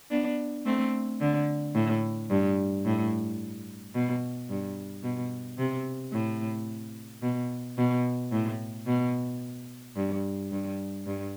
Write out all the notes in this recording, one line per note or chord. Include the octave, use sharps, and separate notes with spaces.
B3 D4
A3 C4
D3
A2
G2
A2
B2
G2
B2
C3
A2
B2
B2
A2
B2
G2
G2
G2